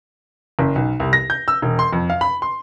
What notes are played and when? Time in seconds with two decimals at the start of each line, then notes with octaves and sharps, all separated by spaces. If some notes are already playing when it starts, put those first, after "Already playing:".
0.59 F#1
0.76 B1
1.00 C2
1.13 A#6
1.30 G6
1.48 E6
1.62 E1
1.79 C6
1.93 F2
2.10 F5
2.21 B5
2.42 C6